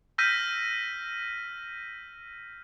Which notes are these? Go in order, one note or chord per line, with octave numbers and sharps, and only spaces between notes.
E6 F6 G6 A#6 B6 D#7